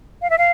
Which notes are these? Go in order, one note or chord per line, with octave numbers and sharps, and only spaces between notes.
F5
E5
F5